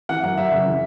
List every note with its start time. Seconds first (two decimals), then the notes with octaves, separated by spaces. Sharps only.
0.09 E3 F#5
0.23 F#2 F#5
0.38 F#2 E5
0.52 C#3
0.66 E3